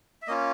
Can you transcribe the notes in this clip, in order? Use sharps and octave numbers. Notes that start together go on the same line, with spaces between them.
E5
A#3 C#4 F4 D#5